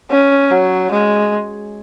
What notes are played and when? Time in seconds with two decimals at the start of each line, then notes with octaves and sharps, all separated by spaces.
0.11 C#4
0.51 F#3
0.92 G#3